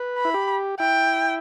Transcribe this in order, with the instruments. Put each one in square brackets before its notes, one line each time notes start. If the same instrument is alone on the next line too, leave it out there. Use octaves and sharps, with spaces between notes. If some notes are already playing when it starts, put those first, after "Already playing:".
Already playing: [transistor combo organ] B4
[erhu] B5
[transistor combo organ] E4
G4
[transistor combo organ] E4 [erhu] G5